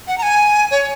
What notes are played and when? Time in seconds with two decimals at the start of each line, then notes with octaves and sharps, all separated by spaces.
0.08 F#5
0.18 A#5
0.23 G#5
0.71 C#5